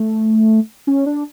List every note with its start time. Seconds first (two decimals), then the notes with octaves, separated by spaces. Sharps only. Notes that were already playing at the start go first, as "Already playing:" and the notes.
Already playing: A3
0.87 C#4
1.06 D4